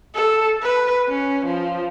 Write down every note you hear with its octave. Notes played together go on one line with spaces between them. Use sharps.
A4
B4
C#4
F3